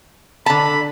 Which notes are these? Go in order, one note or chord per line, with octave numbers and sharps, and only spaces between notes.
D3 A5 B5